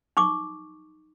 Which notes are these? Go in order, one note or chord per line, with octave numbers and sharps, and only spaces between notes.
D#4 C#6 D6